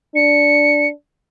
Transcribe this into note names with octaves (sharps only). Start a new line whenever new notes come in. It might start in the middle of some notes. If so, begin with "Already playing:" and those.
D4 C#7